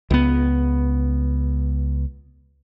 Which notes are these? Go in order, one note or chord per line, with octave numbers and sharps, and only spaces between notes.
C#2 B3